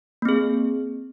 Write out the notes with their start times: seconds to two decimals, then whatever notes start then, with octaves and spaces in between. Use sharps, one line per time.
0.22 A#3
0.25 C4
0.29 G#4